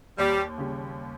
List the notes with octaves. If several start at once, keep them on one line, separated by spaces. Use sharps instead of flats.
D#2 G3
C#3 G3 C#4